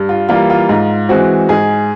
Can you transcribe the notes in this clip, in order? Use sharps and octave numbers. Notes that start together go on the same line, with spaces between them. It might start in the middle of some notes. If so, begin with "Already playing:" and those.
Already playing: G2
F4
E3 G3 A#3 F4
F4
G#2 F4
E3 G#3 C4 F#4
G#2 G#4